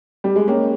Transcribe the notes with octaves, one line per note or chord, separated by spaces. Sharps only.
G3
G#3
A#3 C#4 G#4 C#5 G5